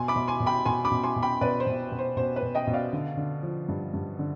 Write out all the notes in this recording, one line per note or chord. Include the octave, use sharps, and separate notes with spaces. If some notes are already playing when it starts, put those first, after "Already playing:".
Already playing: B2 G#5 C6
B5 D6
B2
G#5 C6
B2
G5 B5
B2 G#5 C6
B5 D6
B2
G#5 C6
B2
G5 B5
B2 B4 D5
C5
B2
B2
C5
B2 C5
B4
B2
D#5 G5
B2
D5 F5
D3
D3
F3
G2
G2
D3